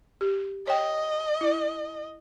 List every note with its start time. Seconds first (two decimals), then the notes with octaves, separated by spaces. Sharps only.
0.21 G4
0.67 C#5 D#5 G5
1.41 E4